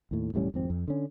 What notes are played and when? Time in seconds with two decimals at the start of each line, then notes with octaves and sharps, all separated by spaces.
0.11 D#2 A2
0.34 E1 A2 G3 C#4
0.54 G#1 F2 C4
0.70 F2
0.88 D3 C#4